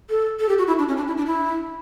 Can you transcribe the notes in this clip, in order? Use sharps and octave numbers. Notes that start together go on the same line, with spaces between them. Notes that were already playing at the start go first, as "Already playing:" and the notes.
A4
A4
G4
F#4
E4
D4
C#4
D4
E4
D4
E4